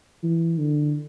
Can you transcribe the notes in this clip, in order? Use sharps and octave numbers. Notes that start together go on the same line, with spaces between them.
E3
D3